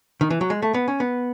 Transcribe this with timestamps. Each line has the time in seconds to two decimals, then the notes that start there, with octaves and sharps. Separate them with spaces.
0.21 D#3
0.30 E3
0.41 F#3
0.50 G#3
0.62 A3
0.74 B3
0.88 C#4
1.00 B3